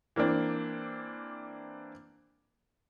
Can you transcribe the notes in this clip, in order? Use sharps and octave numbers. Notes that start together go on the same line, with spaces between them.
E3 A#3 C4 D4